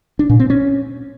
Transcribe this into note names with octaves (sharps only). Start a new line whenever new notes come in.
D4
A#2
C4
C#4